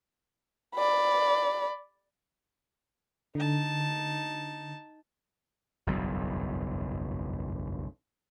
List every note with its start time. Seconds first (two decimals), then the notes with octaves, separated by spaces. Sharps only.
0.76 D5 B5
3.35 D3 D#4 A5
5.87 F#1 B1 E2 G2